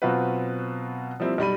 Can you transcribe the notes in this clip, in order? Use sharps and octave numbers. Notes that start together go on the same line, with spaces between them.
B2 F#3 C4 F4 F#4 B4
F3 G3 A#3 C4 E4
B1 G3 B5 D#7